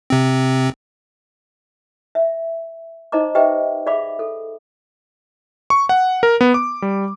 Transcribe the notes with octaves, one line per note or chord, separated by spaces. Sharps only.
C3 C4
E5
D#4 C5 D#5 A#5 D6
G4 B4 C5 D#5 E5 G5
G#4 D5 E5 F5 B5 D6
A4
C#6
F#5
A#4
B3
D6
G3